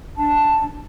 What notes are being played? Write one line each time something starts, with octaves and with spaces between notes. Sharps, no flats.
D4 A5